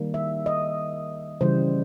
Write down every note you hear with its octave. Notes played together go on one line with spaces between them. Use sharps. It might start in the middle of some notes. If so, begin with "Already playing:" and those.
Already playing: D#3 G3 A#3
E5
D#5
C#3 E3 G3 C5